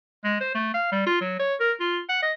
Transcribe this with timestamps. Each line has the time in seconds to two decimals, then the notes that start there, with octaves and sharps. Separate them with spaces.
0.24 G#3
0.40 C5
0.55 A3
0.74 F5
0.92 G3
1.06 F4
1.21 F#3
1.39 C#5
1.60 A#4
1.80 F4
2.09 F#5
2.22 D#5